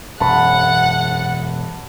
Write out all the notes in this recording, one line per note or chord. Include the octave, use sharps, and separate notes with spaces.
E1 F#2 F#5 A5 B5